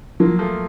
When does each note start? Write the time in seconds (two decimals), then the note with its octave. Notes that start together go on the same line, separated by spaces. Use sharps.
0.20 F3 F#3 A#3
0.39 F3 A3